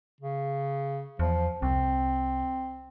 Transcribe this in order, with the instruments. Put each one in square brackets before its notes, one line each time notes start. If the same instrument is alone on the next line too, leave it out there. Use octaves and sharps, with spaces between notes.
[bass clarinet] C#3
[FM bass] E2 [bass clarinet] F3
[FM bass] C2 [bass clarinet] C4